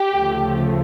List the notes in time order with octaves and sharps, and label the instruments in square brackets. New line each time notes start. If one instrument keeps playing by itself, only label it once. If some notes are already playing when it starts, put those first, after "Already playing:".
Already playing: [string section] G4
D2 C#3 F3 A3